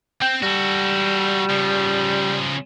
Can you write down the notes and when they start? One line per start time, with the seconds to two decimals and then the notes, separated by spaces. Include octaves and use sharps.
0.22 C4 G5
0.43 G3 F#4 A4
1.50 C#3 F3